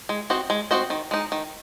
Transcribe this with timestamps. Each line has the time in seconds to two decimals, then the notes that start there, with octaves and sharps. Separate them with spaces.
0.09 G#3
0.30 C4 F#4 C5 D#5
0.50 G#3
0.71 C4 F#4 C5 D#5
0.90 D#3
1.11 G#3 D#4
1.32 D#3